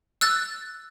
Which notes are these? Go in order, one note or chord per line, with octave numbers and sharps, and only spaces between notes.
E6 F#6 A6